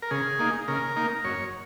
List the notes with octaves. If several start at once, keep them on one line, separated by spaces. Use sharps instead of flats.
A#4
C#3 G#4
A#3 D#4
C#3 A#4
A#3 D#4
F#2 C#5